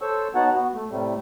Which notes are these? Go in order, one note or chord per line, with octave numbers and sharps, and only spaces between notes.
A4 C5 C#5 C#6 E6
B3 D#4 F#4 C#5 F#5 A5
B3 F#4
A3
A2 C3 G3 A3